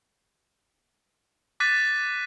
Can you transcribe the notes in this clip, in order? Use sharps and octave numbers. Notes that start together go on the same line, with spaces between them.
D6 F#6 A6 B6 D#7